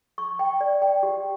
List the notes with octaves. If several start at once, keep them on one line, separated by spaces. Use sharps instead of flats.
C#6
G5
D5
G5
G4